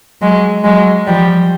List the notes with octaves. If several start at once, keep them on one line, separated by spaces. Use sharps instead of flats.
F#3 G#3
F#3 G#3
F3 G3